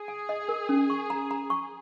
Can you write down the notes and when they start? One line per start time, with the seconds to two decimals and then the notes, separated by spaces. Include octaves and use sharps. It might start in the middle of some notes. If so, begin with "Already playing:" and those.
Already playing: G#4
0.08 G#5
0.29 D#5
0.49 A#4
0.69 C#4
0.90 C#6
1.10 A#5
1.31 A#5
1.50 C#6